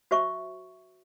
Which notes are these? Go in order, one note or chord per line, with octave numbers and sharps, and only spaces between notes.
F#4 C5 E5 C#6